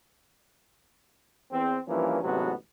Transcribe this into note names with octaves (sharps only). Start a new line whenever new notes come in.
E2 C4
G2 E3 F3 A#3 C#4
A1 G#2 C3 F#3 B3 F#4